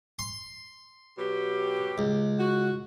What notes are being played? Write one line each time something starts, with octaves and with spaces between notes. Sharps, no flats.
C6
B2 F#3 G4
C#2
F#4